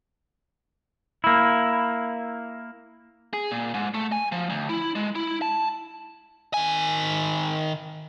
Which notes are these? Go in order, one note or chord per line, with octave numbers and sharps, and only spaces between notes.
A#3 E4
G#4
A#2
G#2
A3
G#5
F3
D2
E4
G#3
E4
A5
D#3 G#5